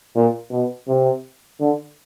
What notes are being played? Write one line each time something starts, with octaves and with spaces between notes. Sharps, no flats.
A#2
B2
C3
D3